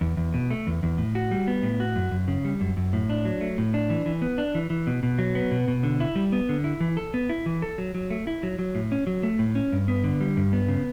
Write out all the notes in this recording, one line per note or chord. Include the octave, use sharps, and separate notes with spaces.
E2
E2
B2
A3
E2
E2
A2
F#4
G3
B3
A2
F#4
F#2
F#2
C#3
G3
F#2
F#2
A2
D4
F#3
A3
A2
D4
E3
E3
B3
D4
E3
E3
B2
B2
F#3
B3
B2
B2
D3
E4
G3
B3
D3
E4
E3
A4
B3
E4
E3
A4
F#3
F#3
A3
E4
F#3
F#3
A2
C#4
F#3
A3
A2
C#4
G2
B3
D3
G3
G2
B3
C#3